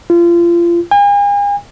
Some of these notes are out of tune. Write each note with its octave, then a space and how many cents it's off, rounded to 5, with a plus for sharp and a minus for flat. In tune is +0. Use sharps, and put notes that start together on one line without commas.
F4 -30
G#5 -40